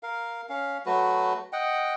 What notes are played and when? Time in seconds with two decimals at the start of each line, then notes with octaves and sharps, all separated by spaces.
0.03 A#4 F5
0.49 C#4 F5
0.86 F#3 A3 F#4 B4
1.53 D#5 F#5 G5